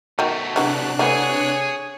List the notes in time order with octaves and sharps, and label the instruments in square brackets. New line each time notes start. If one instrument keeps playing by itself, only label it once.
[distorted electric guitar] B2 A3 [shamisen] D#3 F#3
[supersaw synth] C3 D4 F#6 [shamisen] E3 F#3
[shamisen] E3 A3 B3 [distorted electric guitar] G#4 [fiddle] C#5 G#5